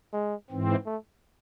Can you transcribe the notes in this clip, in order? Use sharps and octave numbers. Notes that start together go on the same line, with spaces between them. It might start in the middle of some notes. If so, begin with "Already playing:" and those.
G#3
G#2 E3 C4
A3